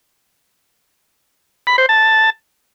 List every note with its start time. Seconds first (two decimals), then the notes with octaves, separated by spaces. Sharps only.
1.67 B5
1.78 C5
1.89 A5